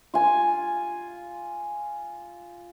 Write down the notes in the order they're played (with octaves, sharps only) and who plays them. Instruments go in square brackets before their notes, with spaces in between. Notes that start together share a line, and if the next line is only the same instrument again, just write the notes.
[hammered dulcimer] F4 G#5